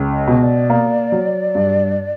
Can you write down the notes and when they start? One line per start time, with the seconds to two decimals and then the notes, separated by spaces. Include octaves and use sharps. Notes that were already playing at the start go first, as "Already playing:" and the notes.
Already playing: C#2
0.13 D#5
0.27 B2
0.42 D5
0.70 A#3
1.12 F#3
1.55 G2